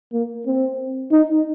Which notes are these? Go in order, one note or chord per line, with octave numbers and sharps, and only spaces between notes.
A#3
C4
D#4